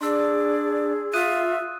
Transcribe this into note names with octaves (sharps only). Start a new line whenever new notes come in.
D4 G#4 D5 C6 E6
F4 E5 D#6 F#6 D#7